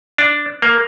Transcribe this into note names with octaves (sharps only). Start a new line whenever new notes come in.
D4
A#3